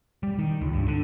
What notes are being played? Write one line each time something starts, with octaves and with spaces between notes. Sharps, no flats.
G3
D#3
C#2
G2
D3